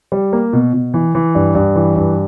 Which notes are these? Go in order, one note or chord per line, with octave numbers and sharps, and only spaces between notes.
G3
A#3
B2
B2
E3
E3
G2
G2
E3
G2